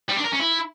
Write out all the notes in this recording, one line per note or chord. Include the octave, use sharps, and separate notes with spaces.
G3
D4
A#4
C#4
E4